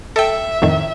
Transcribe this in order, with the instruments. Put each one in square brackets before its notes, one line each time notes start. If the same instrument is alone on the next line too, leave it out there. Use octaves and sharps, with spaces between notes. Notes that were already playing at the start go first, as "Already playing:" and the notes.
[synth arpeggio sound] A4 G5 [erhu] E5
[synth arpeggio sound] F2 A2 D#3